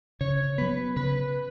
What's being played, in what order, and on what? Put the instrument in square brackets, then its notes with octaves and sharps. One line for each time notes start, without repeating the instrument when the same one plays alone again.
[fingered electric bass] C#3 [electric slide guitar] C#5
[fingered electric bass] F#3 B3 [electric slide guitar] B4
[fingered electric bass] C#3 [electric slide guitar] B4